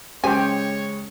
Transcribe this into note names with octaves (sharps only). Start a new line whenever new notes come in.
C#3 G#3 C#4 G4 C5 C#5 G#5